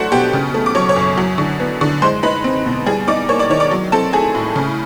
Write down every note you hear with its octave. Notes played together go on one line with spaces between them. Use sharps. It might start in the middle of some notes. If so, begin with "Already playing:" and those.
Already playing: F#3 A3 D4 F#4 C5 F#5 C6
B2 G4 G5
C#3
A3
D6
F#3 C#5 C#6
C#5 C#6
F#2
F#3
D3
B3
D3
G#3 C5 C6
D#4 B4 B5
C4
B2
G3 G#4 G#5
D#4 D5 D6
A#3 C#5 C#6
D5 D6
D#3 C#5 C#6
D5 D6
F#3
C4 A4 A5
A3 G#4 G#5
A2
C#3